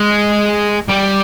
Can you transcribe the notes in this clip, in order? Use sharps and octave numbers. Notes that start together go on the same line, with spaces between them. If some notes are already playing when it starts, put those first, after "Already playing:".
Already playing: G#3
G3